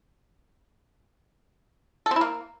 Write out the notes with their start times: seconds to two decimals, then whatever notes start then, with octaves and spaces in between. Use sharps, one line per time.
2.06 A4
2.11 C4
2.16 E4
2.21 A#3